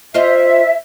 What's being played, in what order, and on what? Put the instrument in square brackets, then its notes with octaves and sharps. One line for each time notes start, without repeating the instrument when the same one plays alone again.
[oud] F4 C5 D#5 [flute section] E5